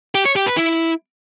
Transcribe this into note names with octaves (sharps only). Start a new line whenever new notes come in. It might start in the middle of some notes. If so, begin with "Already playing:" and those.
G4
C#5
G4
B4
E4